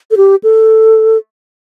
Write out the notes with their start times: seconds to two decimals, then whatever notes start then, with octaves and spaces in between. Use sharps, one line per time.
0.11 A4
0.17 G4
0.44 A4